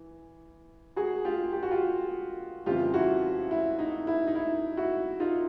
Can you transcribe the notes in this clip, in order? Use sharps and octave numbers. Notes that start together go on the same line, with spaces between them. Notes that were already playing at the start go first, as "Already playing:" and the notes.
Already playing: E3
F#4 G#4
F4 G4
G4
F#4
F4 G4
F2 C#3 E3 G3 F4 G4
E4 F#4
E4
D#4
E4
D#4
E4
E4 F#4
D#4 F4